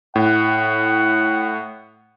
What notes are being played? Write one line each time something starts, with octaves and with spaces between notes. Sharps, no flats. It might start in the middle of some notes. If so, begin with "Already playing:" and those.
A2 F#5